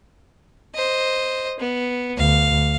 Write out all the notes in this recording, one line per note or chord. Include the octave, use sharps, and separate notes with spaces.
C5 D#5
B3
D2 F5